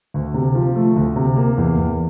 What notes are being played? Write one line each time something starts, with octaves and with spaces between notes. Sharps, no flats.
D2
C3
F3
A3
D2
C3
A#3
E2
E2